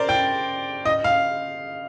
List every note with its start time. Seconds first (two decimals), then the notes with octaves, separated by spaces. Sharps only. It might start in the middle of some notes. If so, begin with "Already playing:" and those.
Already playing: A#4 C5 D5
0.09 G5
0.85 D#5
1.04 F5